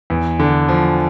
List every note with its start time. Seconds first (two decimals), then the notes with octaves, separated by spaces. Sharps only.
0.10 E2
0.39 D3
0.69 F3